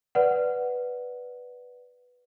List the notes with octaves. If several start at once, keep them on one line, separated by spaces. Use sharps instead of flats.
B4 D5 F#5